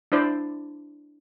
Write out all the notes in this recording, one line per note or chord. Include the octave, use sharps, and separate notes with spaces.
D4 E4 C5 D5